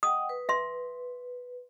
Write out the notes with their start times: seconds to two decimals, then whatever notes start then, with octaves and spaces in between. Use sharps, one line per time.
0.03 D#5 F#5 G5 D#6
0.29 B4
0.49 E5 C6